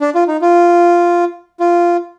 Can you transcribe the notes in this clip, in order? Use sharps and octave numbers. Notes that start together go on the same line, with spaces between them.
D4
F4
D#4
F4
F4